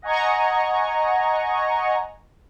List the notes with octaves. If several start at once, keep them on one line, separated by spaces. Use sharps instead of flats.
D#5 F#5 G#5 A#5 C#6